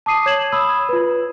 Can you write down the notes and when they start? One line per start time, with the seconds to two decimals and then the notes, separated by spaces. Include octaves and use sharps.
0.06 A5 D6 D#6 C7 D#7
0.26 C#5 G#6 E7 F#7
0.52 B5 D#6 E6 G#6
0.89 F4 B4